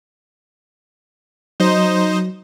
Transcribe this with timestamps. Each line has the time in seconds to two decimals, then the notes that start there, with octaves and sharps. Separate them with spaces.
1.60 F#3 D#4 C5 D#5